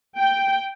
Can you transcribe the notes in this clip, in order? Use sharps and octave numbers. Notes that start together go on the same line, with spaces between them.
G5